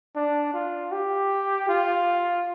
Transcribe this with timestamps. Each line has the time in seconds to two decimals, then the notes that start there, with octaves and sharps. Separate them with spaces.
0.16 D4
0.54 F4
0.92 G4
1.69 F4